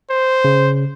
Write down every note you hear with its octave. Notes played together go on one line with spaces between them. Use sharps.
C5
C#3